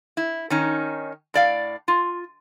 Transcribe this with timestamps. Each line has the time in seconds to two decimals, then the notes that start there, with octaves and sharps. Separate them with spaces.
0.17 E4
0.50 D#3 C#4 D#4
1.34 A2 D5 F5
1.88 F4